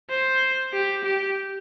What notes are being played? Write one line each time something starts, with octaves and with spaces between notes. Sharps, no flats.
C5
G4
G4